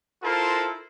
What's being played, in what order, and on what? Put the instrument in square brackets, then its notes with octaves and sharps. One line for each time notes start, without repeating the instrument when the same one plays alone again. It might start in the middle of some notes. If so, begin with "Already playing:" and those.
[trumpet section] E4 F4 A4 A#4 C5